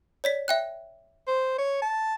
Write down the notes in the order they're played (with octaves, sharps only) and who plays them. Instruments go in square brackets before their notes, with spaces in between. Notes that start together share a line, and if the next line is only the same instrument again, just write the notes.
[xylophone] C#5 D5 B6
E5 G5 F#6
[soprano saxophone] C5
C#5
A5